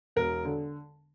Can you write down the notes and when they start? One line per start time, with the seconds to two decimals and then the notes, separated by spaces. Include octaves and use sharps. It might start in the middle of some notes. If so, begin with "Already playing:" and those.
0.16 E1 A#4
0.45 D3